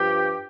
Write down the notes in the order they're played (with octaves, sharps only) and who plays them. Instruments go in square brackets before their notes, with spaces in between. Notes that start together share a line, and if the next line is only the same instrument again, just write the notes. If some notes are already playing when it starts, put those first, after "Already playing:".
Already playing: [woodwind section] G2 F3 G4